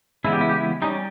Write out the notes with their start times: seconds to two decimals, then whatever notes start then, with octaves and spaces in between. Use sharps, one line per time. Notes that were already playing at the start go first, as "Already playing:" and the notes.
0.24 C#3 E3 G#3 B3 E4
0.33 G4
0.41 E4
0.49 G4
0.58 E4
0.82 G3 C#4 D#4